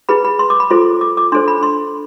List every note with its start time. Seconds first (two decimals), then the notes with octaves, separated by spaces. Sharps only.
0.09 E4 G#4 B4 B5
0.25 B5
0.39 C6
0.50 D6
0.60 B5
0.70 F4 A4 C5 C6
1.01 D6
1.17 D6
1.32 D4 A4 C5 C6
1.48 B5
1.63 C6